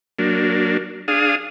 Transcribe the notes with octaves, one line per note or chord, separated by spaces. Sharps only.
F#3 A#3 D4
D4 G#4 F5 D#6